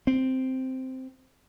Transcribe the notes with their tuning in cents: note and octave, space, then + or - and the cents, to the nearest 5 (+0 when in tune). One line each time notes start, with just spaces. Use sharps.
C4 -5